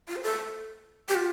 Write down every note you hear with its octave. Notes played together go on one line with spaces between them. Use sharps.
F4
C5
A4
G4
F4